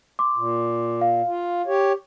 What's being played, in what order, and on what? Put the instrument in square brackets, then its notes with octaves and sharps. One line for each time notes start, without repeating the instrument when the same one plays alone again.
[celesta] C6 D6
[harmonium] A#2
[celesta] F5
[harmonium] F4
G4 C#5